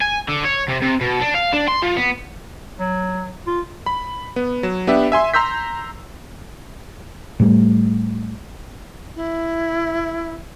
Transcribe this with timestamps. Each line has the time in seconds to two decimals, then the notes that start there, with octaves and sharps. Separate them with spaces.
0.02 G#5
0.29 D3
0.45 C#5
0.69 C3
0.82 C3
1.01 B2
1.21 D4
1.35 F5
1.54 D4
1.68 C6
1.83 F3
1.97 B3
2.80 F#3
3.47 F4
3.86 B5
4.36 B3
4.63 F#3 E7
4.87 B3 D4 G4 E5
5.12 E5 G#5 C6 E6
5.34 A#5 C6 E6 G6 B6
7.40 A2 G3 A3
9.16 E4